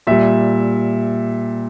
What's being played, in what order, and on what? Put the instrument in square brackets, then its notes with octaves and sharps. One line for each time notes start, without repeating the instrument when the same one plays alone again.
[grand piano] A#2 G3 E5